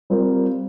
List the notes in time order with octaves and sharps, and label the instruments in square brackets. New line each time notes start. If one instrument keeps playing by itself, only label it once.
[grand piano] G3 C4 F4 A#4